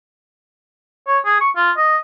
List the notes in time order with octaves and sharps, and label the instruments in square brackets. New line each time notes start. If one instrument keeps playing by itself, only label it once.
[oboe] C#5
G#4
C#6
F4
D#5